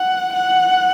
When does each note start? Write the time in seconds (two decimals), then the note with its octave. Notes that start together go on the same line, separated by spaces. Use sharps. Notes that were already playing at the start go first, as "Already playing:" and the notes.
Already playing: F#5
0.34 F#5